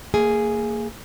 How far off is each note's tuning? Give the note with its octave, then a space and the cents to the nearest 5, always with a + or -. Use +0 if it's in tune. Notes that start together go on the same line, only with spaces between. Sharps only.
A#3 -30 G#4 +0